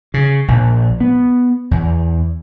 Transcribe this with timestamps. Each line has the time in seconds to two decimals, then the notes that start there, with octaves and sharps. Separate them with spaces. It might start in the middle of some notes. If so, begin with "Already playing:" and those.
0.14 C#3
0.48 A#1
1.00 B3
1.71 E2